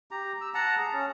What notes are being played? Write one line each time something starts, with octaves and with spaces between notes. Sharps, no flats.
G4 A#5
E6
F#5 A5 A#5
G#4
C#4